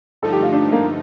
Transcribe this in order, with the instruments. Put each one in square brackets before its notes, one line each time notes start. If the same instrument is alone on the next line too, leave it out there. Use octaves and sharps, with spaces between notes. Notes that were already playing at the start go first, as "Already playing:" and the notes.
[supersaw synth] G2 D3 F3 A3 D#4 [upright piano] A4
[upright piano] G4
F4
D4
A#3